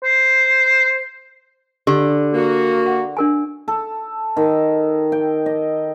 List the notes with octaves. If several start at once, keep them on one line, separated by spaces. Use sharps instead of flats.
C5
D3 G4
A#3 F#4
F#5
D4 A#4 G#5
A4
D#3
G5
D#5